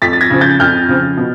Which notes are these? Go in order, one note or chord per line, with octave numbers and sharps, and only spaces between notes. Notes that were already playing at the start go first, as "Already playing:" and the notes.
F2 A6 B6
A6
G#6 A#6
C#3 F3
G6 A6
F2 F6 G6
C#3 F3
B2